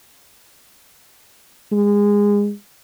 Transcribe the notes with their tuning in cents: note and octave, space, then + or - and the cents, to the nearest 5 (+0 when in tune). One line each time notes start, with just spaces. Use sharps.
G#3 -25